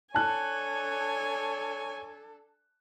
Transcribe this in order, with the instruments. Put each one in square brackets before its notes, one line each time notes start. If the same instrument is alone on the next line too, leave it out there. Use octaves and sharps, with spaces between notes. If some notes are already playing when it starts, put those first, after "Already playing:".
[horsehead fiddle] D4 A4 [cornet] C#5 [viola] G#5 [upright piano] A5 F#6